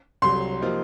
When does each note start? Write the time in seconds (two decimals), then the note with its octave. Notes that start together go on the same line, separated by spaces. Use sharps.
0.22 C2 C3 F#3 C6
0.61 C3 F3 A#3 D#4